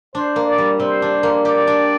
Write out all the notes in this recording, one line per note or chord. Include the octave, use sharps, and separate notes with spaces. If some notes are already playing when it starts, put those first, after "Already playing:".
D4 C5
A#3
D5
G3
C3 C5
D4
A#3
G4 D5
D4